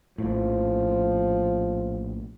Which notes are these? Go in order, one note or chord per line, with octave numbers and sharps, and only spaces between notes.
A#1 A2 F3